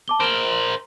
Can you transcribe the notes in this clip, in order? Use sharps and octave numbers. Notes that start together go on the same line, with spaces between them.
A5 D6 G7
A#4 C5 D7 E7 G7
C6